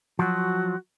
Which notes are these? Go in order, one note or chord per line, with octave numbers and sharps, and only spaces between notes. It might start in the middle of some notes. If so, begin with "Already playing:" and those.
F3 F#3 F#4